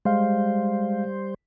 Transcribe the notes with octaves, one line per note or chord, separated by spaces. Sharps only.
G3 G#3 C5 F5